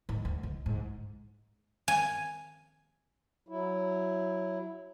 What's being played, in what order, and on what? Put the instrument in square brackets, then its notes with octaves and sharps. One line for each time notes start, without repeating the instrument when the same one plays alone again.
[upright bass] G#2
D2
C#2
G#2
[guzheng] G#5
[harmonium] F#3 E4